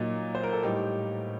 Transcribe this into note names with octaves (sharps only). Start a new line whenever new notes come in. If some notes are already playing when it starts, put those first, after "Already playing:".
Already playing: A#2 F#3 D#4
C5
A#4
A4
A2 G3 D#4 G4